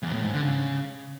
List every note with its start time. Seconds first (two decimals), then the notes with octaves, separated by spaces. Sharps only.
0.03 E2
0.13 A2
0.23 G#2
0.33 D3
0.43 C#3